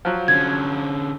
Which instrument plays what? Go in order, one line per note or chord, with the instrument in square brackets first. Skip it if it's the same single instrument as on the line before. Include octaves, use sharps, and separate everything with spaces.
[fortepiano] F3 F#3
[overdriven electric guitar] D3 C#4 [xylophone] G#6